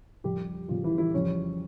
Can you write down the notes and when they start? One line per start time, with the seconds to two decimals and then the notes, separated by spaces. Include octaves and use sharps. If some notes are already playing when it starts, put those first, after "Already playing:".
0.24 F2 C#3 G3 G4
0.68 F2 C#3 F3 G3 F4
0.84 E3 E4
0.98 E3 E4
1.14 F2 C#3 G3 C#4